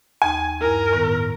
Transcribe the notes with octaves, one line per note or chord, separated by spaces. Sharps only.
D#2 D#4 G5 G#5
G2 E4 A#4
A2 D#3 B3